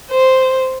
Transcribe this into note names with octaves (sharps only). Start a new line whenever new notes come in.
C5